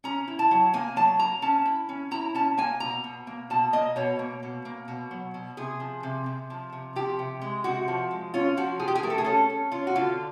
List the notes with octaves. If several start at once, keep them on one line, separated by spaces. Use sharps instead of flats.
C#4 A#5
E4
A5
F#3
A#3 G#5
F#3 A5
A#3 A#5
C#4 A5
E4
C#4
E4 A#5
C#4 A5
A#3 G#5
B2 A#5
B2
A#3
B2 A5
A#3 D#5
B2 C#5
A#3
B2
A#3
B2
F#3
B2
C3 G#4
F3
C3
C3
F3
C3
F3 G4
C3
G#3
C3 F#4
F3
G#3
C#4 F4
F3 F#4
F3 G#4
G4
G#4
A3 A#4
A4
G#4
C#4 A4
C#4
C#4 F4
F#4
D3 F4